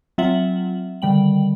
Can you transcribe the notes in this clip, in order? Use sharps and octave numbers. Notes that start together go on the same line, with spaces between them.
F#3 C4 F4 E5 F#5 F#7
D3 D#3 G3 G5 F#7